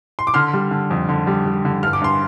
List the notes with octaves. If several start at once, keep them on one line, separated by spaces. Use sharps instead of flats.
C6
D6
D3 C6 F6
G3
D3
F2
D3
G3
G3
D3
G2 F6
D6
G2 C6